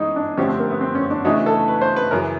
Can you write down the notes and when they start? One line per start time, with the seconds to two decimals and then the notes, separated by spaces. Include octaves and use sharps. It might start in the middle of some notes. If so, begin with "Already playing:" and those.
Already playing: E3 G#3 C#4 D#4
0.16 D4
0.37 D3 F3 A3 C#4 D4 G4
0.48 C4
0.59 A#3
0.70 B3
0.81 C4
0.95 C#4
1.10 D4
1.24 C#3 E3 A3 D4 D#4 F#4
1.46 A4
1.68 B4
1.81 C5
1.96 B4
2.11 F#2 C#3 E3 A#4